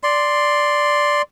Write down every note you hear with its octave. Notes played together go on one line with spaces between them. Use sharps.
D5 C6